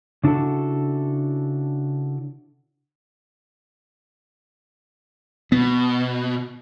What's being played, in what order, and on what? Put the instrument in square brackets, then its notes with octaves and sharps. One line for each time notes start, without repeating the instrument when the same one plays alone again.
[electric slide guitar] C#3 D4 E4 F#4 A4
[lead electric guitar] B2 [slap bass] B3